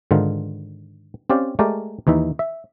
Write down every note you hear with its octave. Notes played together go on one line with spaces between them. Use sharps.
G#2 D3 D#3 F4
C4 C#4 G4 D5 F5
G#3 A3 G4 A#4 D5
D#2 E3 D#4 E5
E5